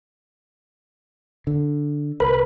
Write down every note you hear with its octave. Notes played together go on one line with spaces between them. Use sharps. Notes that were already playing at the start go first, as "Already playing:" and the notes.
D3
C2 A#4 B4 B5